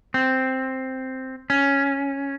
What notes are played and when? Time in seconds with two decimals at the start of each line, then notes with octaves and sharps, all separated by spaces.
0.14 C4
1.50 C#4